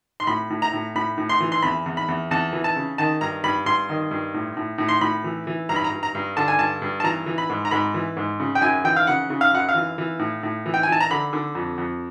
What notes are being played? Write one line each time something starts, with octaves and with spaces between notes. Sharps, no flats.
C6
A2 B5
A2
A#5
A2
A2 B5
A2
C6
E3
C6
E2 B5
E2
B5
E2
E2 A5
E3
A5
C#3
D#3 A5
G2 A#5
G2 B5
G2 C6
D#3
G2
A2
A2
A2
C6
A2 B5
E3
E3
G2 A#5
B5
A#5
G2
A#5
G2
D3 A5
G#5
G2 A5
G2
A5
E3 A#5
E3
B5
G#2
A#5
G#2 B5
E3
G#2
C#3
G5
F#2 G#5
E3 G5
F5
C#3 F#5
C#3
F5
F#2 F#5
F5
E3
E3
A2
A2
E3
G5
G#5
E3 A5
A#5
D3 B5
D3
F2
F2